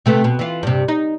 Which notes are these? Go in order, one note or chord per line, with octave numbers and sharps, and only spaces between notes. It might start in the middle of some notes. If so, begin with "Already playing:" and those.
C3 A3 B3
B2
E3 F4
G2 C3
D#4